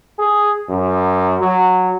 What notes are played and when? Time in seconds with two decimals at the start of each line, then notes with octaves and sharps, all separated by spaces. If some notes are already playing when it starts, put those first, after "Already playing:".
0.19 G#4
0.69 F#2
1.42 F#3